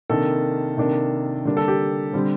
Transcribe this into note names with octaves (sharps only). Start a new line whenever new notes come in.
C3 D#3 A#3 D4 A4
C3 D#3 A#3 D4
D3 G3 A#3 D4
A4
G4
D3 G3 C4